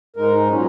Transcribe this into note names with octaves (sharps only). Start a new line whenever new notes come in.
G#2 G#3 D#4 A#4
A#2 F#3 C#4